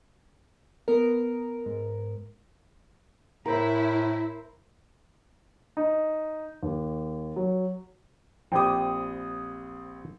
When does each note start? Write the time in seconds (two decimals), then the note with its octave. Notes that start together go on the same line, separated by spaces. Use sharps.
0.88 B3 A#4
1.66 G#2
3.46 A2 E4 A#4 C5 E5
5.77 D#4
6.63 D#2
7.36 F#3
8.52 A#1 C4 G4 G5 D#6